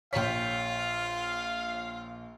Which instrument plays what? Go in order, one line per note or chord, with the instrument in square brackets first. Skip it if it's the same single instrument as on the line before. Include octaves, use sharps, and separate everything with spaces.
[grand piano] A#1 B6 [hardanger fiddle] F4 [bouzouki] C#5 G5 [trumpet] F5